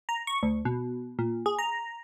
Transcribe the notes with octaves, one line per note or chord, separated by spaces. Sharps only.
A#5
C#6
D2
B2
A#2
G#4
A#5